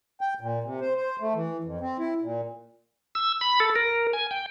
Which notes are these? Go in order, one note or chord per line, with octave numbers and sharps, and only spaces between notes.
G5
A#2
C3
C5
C5
A3
E3
F2
C4
E4
A#2
E6
B5
A4
A#4
G#5
G5